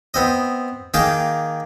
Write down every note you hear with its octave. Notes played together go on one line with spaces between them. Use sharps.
B3 C4 D#5
D#3 A#3 G#4 G5 D6